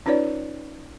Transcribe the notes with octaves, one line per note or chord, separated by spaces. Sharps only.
C#4 D#4 F4 B4 C#5 D5